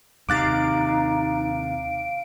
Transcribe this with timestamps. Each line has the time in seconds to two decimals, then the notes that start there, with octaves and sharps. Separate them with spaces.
0.29 D#2 C3 D#4 F5 D6 F#6 A6 D7